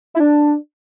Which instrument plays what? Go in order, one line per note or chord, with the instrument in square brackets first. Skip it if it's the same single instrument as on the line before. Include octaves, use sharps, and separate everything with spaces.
[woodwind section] E4
D4